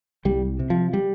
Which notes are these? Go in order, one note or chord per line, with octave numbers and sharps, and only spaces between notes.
C2 G3
C3
F3
G3